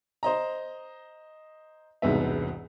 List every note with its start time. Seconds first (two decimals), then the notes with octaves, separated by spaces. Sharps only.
0.23 C5 D#5 A#5
2.02 E1 C2 G#2 B3 E5